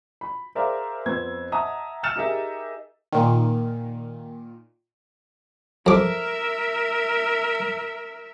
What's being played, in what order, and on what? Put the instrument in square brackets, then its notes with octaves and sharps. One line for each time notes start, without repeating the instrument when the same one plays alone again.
[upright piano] B5
G#4 A#4 C5 D5 E5 F5
F2 B3 C4 E6 G#6
D#5 E5 F#5 A5 A#5 D#6
E6 F6 A6 C#7 E7
D#4 G4 G#4 A#4 D#5 E5
[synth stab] A#2 D#3
[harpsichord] F2 D6 [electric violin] A#4 E5